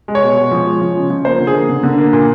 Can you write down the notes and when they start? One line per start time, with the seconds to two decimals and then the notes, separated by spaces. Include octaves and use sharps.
0.08 G#3
0.15 C#5
0.23 B2
0.38 G#3
0.51 F3
0.66 G#3
0.82 F3
0.96 C#3
1.10 F3
1.25 A#3 C5
1.40 D3
1.47 G#4
1.55 A#3
1.69 D3
1.83 D3
1.98 A#3
2.13 A#2